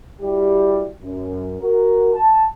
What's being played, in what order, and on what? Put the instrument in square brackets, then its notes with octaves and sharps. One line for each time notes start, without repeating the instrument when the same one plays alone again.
[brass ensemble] G3 E4 F#4 G4
F#2
F#4 A#4
A5